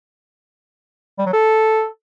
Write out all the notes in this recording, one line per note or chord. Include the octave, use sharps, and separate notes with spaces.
G3
F#3
A4